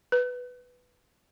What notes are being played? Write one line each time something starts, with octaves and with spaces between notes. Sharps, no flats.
B4